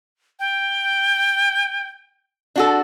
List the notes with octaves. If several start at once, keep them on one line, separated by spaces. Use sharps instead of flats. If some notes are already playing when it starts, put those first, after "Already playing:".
G5
D4 F#4 A4